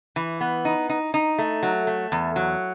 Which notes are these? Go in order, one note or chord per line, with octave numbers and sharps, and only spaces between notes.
E3
B3
D#4
D#4
D#4
A3
F#3
A3
E2
F#3